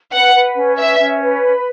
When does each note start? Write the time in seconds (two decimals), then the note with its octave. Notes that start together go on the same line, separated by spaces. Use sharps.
0.12 B4 F#5
0.35 B4
0.56 C#4
0.77 B4 E5
0.99 C#4
1.22 B4
1.43 B5